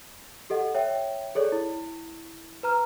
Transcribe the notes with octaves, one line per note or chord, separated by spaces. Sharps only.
G4 A4 D#5 F#5
C#5 E5 G5
G#4 A4 C#5 D5
E4
B4 A#5 F6